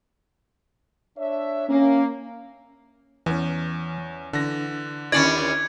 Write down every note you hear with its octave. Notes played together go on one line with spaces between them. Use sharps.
D4 C#5 E5
A#3 C#4
E2 E3 C#4
D3 E3 D4 A#6
D#2 D3 C#4 E4 D5 G#6